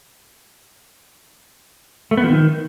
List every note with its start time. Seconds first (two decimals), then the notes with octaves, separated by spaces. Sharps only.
2.11 A3
2.17 B3
2.24 F3
2.30 D#3